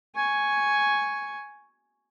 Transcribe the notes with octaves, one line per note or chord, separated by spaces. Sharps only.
G#5 C#6